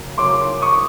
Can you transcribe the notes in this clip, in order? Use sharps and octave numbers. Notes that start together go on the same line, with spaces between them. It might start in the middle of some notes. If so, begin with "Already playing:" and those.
Already playing: C#3 F#3 A#3
C#3 F#3 A#3 C#4 C6 D6
C#6 D#6